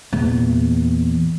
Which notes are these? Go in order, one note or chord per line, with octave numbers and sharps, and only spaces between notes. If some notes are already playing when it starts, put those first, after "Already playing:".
E2 A#2